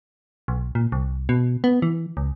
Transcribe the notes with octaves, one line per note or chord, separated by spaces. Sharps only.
B1
A#2
C2
B2
B3
E3
C#2